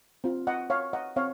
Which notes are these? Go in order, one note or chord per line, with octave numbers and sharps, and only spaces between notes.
C4 F4
D#5 F#5
C#5 F5
D#5 F#5
C4 C#5 F5